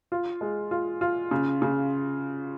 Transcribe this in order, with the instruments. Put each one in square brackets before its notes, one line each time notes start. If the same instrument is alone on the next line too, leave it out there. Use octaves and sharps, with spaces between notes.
[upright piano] F4
G#3
F4
F4
C#3
C#3